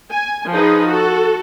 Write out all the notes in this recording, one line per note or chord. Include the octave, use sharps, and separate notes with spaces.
G#5
F3 D#4 G#4 B4
F#4 A4